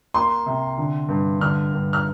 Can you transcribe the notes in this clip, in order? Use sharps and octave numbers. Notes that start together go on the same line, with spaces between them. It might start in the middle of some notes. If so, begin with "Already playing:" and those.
A#3 C6
C3
D3
G2
D3 F6
G2
F6